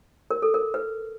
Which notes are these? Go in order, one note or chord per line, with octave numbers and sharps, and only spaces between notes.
A#4
A4
A#4
B4